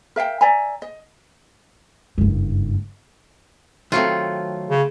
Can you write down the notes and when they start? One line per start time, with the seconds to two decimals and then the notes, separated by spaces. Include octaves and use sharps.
0.16 A#4 E5 F5 G5
0.41 D5 E5 G#5 A#5
0.82 D#5
2.18 F#1 G2
3.92 D#3 F#3 A3 C4 F4
4.70 C#3